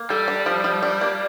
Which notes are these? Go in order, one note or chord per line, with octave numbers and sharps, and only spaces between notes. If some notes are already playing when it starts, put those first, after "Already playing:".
Already playing: A#3
G3 A4
D4
F3
F3
D4
A#3